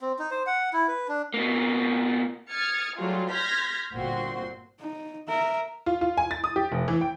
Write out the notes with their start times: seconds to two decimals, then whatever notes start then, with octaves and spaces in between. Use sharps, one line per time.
0.01 C4
0.19 D#4
0.31 C5
0.46 F#5
0.73 E4
0.88 B4
1.08 D4
1.34 B2 A#3
2.49 D#6 F6 G#6 A6 C#7
2.97 F#3 G3 A3 F4 F#4 G#4
3.29 C6 F6 G6 G#6 A#6 B6
3.93 G1 A#2 C4 F#4 C6
4.80 D#4
5.28 A#4 E5
5.86 F4
6.01 F4
6.17 G#5
6.31 A6
6.44 D#6
6.56 G4
6.72 F1
6.88 E3
7.01 G5